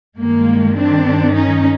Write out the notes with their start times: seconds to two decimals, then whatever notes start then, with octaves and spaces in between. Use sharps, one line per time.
0.18 G2 D#3 G#3 A#3
0.76 C4 D4
1.34 C#4 D#4